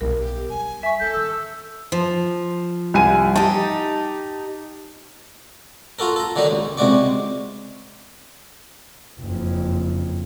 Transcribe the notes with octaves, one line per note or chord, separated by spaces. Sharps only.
B1 B3 A#4
G4
G3 G#5
E5 C#6 B6
E3 C#4 A4 G6
D#3 C#4 E6
F3
C2 G#5 D#7
D#4 G4 A5
F4 F#4 A4 A#4
A4 A#5
D3 D#3 F#3 G3 D#4
C#2
C#2 C3 G#3 F#4 D5 C#6
F#1 F2